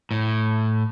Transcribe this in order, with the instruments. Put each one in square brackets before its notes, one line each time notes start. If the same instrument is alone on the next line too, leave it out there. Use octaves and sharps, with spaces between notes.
[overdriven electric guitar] A2